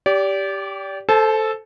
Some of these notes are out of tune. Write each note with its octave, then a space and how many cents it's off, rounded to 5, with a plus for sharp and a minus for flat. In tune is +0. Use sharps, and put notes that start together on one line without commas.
G4 +0 D5 -30
A4 +0 C5 +0 A5 -35